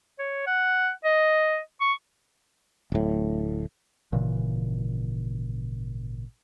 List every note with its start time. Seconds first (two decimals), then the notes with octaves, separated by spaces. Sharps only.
0.19 C#5
0.47 F#5
1.04 D#5
1.81 C#6
2.92 D1 A2
4.12 G#1 A#2 C#3 E3